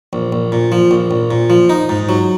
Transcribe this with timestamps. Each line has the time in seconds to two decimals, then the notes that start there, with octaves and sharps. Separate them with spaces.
0.13 A#1
0.32 A#1
0.52 A#2
0.72 F3
0.91 A#1
1.11 A#1
1.31 A#2
1.50 F3
1.70 D#4
1.89 G#2
2.09 F#3